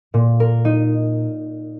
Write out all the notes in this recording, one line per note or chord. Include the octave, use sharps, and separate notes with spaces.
A#2
A#4
D#4